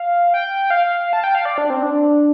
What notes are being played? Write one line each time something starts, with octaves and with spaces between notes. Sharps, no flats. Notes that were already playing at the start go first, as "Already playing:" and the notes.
Already playing: F5
G5
F5
A5
G5
F5
D5
D4
C4
D4